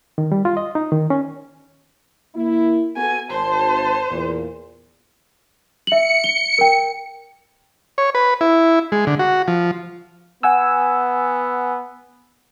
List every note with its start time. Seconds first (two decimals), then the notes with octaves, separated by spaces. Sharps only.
0.18 D#3
0.32 G3
0.45 F4
0.57 D#5
0.75 D#4
0.92 D#3
1.10 C#4
2.35 A#3 E4
2.97 B3 F#4 A4 G#5
3.31 G#1 C5 A5
4.09 E2 A#2
5.87 E5 C#7 F#7
6.24 G7
6.58 A#4 G5
7.98 C#5
8.15 B4
8.41 E4
8.92 G#3
9.07 D3
9.19 F#4
9.48 F3
10.43 B3 F#5 G#5 E6